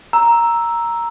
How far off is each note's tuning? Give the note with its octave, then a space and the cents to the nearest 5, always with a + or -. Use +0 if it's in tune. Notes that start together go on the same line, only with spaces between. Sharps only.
A#5 +0 E6 +0